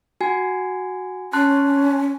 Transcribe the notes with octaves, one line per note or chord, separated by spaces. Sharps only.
F#4 G#5
C#4 A5 C6 F#6